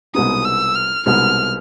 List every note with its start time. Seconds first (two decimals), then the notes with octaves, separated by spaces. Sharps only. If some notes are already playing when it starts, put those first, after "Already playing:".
0.14 C2 B2 G#3 B3 D#4 D#6
0.45 E6
0.75 F6
1.06 C2 B2 G#3 B3 D#4 F6